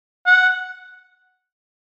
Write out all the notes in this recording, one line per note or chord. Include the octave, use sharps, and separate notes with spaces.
F#5